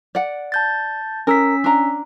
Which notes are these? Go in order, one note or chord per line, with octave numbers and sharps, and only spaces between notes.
D5 F#5
A5 G6 A6
C#4 A#4 E6 B6
D4 A#5